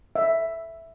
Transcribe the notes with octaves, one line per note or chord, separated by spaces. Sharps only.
E5